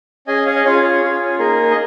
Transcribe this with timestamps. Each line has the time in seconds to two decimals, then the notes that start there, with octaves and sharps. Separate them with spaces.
0.27 C#4 G#4 D#5 G#5
0.46 C#5 F5
0.56 D#5
0.65 C#4 F4 G#4 C#5 F5
0.83 C#5
1.02 C#4 F4 G#4 C#5
1.39 A#3 D#4 G#4 A#4
1.71 D#5